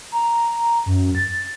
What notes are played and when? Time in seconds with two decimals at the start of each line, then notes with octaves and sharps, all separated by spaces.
0.12 A#5
0.86 F#2
1.15 A6